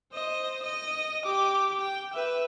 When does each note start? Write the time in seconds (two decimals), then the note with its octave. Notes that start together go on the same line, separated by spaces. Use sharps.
0.13 C5 D#5
0.63 D#5
1.26 G4 D6
1.80 G5
2.14 B4 E5